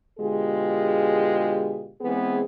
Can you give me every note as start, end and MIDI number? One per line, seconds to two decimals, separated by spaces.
0.19 1.91 47
0.19 1.91 50
0.19 1.91 56
0.19 1.91 65
0.19 1.91 67
0.19 1.91 68
2.01 2.41 52
2.01 2.41 56
2.01 2.41 59
2.01 2.41 60
2.01 2.41 68